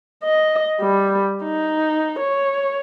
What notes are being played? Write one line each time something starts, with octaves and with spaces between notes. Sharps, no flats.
D#5
G3
D#4
C#5